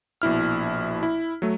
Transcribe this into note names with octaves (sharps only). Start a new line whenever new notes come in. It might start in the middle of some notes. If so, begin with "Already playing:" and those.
A#1 B2 E4 F6
E4
F#3 A3